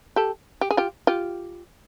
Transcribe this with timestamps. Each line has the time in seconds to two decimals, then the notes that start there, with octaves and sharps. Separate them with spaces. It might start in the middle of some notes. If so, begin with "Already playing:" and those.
0.16 G4 A4
0.61 G4
0.71 G#4
0.77 F4 G4
1.07 F4 G4